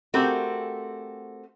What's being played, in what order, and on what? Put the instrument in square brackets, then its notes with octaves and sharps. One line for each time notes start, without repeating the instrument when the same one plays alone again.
[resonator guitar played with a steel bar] A3 C4 F#4 G4 A#4